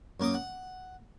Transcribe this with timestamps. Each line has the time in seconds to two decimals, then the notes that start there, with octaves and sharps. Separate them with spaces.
0.20 F#2 A#3 D6 D#6
0.34 F#5